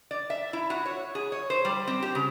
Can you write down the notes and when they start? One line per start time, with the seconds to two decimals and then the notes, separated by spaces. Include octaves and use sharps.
0.11 D5
0.30 E5
0.53 E4
0.70 F#4
0.86 C#5
1.15 G#4
1.32 C#5
1.50 C5
1.65 G3
1.87 C4
2.02 G4
2.15 C#3